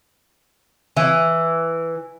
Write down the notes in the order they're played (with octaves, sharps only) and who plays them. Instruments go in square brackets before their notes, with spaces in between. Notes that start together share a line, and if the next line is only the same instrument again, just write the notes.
[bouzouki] E3